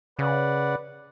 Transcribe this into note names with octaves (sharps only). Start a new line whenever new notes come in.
C#3 B4 D5 F#5